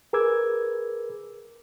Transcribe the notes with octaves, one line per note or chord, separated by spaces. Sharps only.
G#4 A#4 B4 D6 E6 G#6